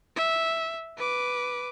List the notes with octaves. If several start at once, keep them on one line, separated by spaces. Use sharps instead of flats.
E5
B4 D6